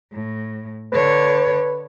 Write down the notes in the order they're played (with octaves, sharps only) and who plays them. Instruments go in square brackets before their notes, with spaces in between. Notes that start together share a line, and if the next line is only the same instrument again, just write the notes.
[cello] A2
[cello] D3 C#5 [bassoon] B4